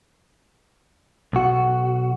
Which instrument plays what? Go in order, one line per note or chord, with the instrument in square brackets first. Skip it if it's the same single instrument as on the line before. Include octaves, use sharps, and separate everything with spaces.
[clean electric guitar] B1 F#4